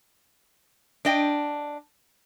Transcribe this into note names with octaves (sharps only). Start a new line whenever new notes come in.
D4 D#5 G5